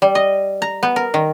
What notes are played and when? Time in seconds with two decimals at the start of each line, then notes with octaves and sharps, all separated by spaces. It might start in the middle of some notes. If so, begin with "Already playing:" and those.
0.02 G3
0.15 D#5
0.62 A#5
0.83 B3
0.96 A#4
1.14 D#3